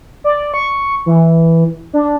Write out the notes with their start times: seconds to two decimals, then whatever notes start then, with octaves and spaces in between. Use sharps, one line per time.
0.24 D5
0.54 C#6
1.06 E3
1.93 D4